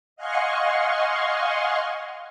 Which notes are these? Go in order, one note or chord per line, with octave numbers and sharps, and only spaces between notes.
D#5 F5 F#5 G#5 C6 C#6